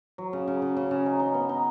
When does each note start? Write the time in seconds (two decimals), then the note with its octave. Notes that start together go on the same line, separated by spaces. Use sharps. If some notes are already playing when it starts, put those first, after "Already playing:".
0.18 F#3
0.33 C#3
0.48 C#3
0.62 C#3
0.77 C#3
0.91 C#3
1.06 D#4
1.20 D#4
1.34 B3
1.49 D#4